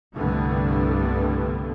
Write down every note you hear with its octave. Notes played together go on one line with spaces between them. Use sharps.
C2 G2 D3 A3 B3